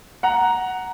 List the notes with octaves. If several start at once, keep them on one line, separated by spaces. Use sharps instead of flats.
F#5 A#5